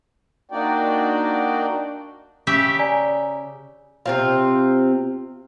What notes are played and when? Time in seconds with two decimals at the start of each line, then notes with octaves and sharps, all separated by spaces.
0.51 A#3 D4 D#4 F#4 D5 G5
2.47 C#3 G4 E5
2.79 D5 G#5 A#5
4.06 C3 C4 F4